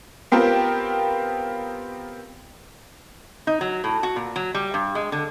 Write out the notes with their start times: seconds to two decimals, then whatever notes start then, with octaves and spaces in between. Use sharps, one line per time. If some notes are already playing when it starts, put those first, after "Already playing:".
0.32 B3 C4 F4 G4 A#4
3.47 D#4
3.61 F#3
3.84 A2
4.03 F#4
4.16 A#2
4.36 F#3
4.55 G3
4.74 G2
4.95 G#3
5.12 D3